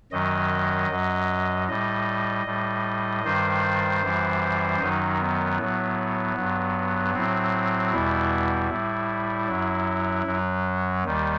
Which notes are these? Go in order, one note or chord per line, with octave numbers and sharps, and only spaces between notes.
F#2 D#3 F#3 D#5
F#2 F#3
A2 G3 D#5
A2 G3
G2 D#3 G3 C5
F#2 E3 G3
F#2 D#3 F#3 D#4
B3
A2 F#3
G2 F#3
A2 F#3 C4
E2 B2 G3 E4
A2 G3
F#2 F#3
F#2 F#3
D#2 D#3 G3